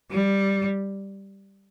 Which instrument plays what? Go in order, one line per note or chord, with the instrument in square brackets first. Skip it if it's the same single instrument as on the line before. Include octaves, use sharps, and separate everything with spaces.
[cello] G3